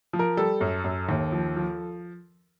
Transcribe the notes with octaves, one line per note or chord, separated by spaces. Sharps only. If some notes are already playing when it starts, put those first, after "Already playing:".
F3
A#4
G3 A4
F#2
F#2
D#2
F3
F3